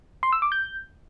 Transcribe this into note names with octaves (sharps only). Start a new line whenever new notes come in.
C6
E6
D6
G6